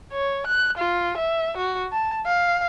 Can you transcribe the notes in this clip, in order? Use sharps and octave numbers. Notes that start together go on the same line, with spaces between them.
C#5
F#6
F4
E5
F#4
A5
F5